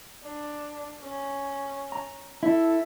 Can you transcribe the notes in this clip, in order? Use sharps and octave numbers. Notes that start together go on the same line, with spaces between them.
D4
C#4
A#5
E4 A4